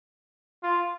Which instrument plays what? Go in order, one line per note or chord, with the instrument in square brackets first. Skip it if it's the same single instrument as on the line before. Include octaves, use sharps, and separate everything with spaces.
[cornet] F4